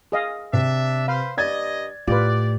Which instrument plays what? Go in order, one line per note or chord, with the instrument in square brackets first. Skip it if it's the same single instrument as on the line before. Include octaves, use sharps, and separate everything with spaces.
[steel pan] G#4 D#5 F5
[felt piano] C3 [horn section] D4 E5
[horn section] B4 C5 [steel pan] F5
[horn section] G2 D#5 [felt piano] D5 G#6 A6
[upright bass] A2 [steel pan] F4 B4 [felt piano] G4 [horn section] D5